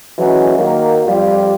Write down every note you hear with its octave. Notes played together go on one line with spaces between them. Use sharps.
E3 F#3 G#3 A3 C#4
D#3 F#3 A#3
F2 G3 F4 G4